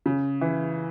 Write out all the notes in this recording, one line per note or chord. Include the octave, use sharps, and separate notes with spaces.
C#3
E3